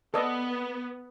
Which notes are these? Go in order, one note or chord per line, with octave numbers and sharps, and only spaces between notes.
B3 A4 D5 D#5